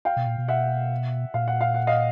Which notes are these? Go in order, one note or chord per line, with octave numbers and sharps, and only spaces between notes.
F5 G5
B2
A#2
B2
E5 F#5
A#2 F5
F#5
F5
F#5
D#5 F5